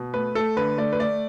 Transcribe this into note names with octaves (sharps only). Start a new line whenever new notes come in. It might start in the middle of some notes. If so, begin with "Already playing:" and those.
Already playing: B2
A3 B4
A3 A4
D3 B4
A3 D5
B4
A3 D5